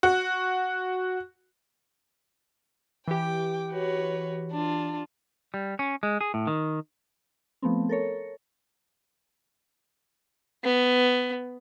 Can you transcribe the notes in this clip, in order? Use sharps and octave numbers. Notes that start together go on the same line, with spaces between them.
F#4
E3 G4 G5 D6
F#4 B4 C#5
D4 F4
G3
C#4
G#3
G#4
A2
D#3
F3 A3 B3 C4
A4 A#4 C#5
B3